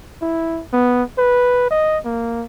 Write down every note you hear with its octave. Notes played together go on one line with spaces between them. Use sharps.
E4
B3
B4
D#5
A#3